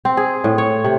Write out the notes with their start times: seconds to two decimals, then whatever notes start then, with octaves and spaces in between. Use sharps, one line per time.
0.05 C4
0.17 G#4
0.44 A2
0.58 C#5
0.84 C3